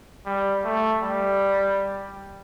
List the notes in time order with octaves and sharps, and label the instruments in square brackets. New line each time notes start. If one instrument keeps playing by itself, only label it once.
[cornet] G3
A3
G3